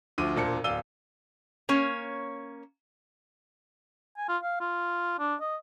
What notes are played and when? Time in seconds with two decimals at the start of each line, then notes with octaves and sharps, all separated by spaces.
0.18 D2 F3 D6 D#7
0.36 E1 A#2 A#3 D4 C5 C#7
0.64 D1 D5 F5 E6 D#7 G7
1.69 A#3 C#4 C#5
4.17 G#5
4.29 F4
4.43 F5
4.60 F4
5.19 D4
5.41 D#5